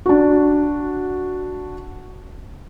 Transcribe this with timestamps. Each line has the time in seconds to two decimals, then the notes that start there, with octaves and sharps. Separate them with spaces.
0.06 D4 F#4